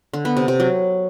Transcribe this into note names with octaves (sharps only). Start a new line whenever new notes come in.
D3
B3
C3
C3
F#3